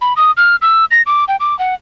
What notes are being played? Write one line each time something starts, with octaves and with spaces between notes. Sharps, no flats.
B5
D#6
F6
E6
A#6
D6
G5
D6
F#5